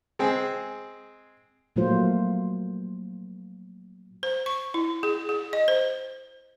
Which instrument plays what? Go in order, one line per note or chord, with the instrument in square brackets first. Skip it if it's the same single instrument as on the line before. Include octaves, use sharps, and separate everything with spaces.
[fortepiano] G#3 C4 G#4
[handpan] A#2 F#3 A3 A#3 F4 C5
[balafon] C5
C#6
E4
G#4
G#4
D#5
C5